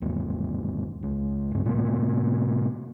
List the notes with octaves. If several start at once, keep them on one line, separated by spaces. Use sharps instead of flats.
G1 D#2
C#2
B1 G2
A2 C3 A#3